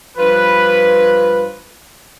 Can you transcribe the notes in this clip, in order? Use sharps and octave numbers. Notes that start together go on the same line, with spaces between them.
G2 F3 F4 B4